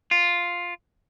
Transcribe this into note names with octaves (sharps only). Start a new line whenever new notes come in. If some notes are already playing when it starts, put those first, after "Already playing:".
F4